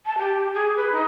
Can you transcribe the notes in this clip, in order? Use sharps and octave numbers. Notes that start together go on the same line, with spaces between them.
A5
G4
G#4
B4
D#4